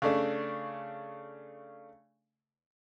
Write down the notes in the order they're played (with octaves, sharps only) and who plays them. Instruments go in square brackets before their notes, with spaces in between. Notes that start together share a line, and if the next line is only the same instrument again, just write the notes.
[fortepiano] C#3 A3 D4